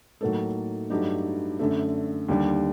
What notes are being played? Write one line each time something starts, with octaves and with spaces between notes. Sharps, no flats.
A2 F#3 A#3 D#4 A4
G2 F#3 A3 D#4 G4
F#2 D3 A3
D#2 D3 G3